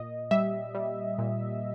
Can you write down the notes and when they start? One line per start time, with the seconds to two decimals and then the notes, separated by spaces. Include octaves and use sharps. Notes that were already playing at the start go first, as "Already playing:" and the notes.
Already playing: A#2 D#5
0.31 G3 E5
0.75 G3
1.18 A#2